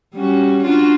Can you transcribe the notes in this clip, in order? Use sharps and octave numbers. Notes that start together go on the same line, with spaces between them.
G3 C#4 F#4
D4 F4 F#4